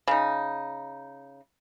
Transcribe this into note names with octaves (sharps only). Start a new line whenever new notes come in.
C#3 D#4